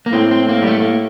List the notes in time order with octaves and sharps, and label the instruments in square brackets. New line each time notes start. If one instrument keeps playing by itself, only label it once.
[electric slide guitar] A#3
[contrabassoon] A2 [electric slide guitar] C4
[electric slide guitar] C4
A#3
G3
A3
A#3